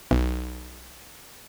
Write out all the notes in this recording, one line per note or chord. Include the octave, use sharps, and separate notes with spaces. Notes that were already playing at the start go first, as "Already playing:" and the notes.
B1